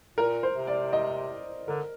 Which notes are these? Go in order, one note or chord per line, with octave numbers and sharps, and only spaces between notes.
A#2 A#4
C5
C3
D5
D#5
D3 A#4